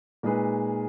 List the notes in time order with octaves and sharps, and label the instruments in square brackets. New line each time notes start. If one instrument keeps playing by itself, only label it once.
[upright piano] A#2 G#3 D#4 G#4 B4